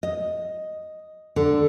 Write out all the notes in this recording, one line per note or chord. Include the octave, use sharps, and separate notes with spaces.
D#5
D3